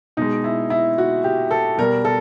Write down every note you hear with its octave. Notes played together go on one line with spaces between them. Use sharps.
B2 G#3 D#4
E4
E4
F#4
G4
A4
B2 G3 A#4
A4